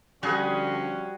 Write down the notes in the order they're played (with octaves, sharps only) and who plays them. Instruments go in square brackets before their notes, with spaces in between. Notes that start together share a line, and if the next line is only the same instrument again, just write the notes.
[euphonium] D3 [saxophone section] F3 C#4 [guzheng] G3 [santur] F#4 G#4 F#5